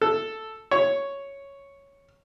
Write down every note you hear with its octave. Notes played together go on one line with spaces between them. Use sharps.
A4
C#5